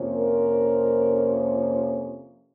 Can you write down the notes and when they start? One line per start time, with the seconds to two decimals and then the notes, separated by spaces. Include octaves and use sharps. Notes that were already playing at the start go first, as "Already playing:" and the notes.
Already playing: F2 C3 F3 A#3 C#4
0.16 A#4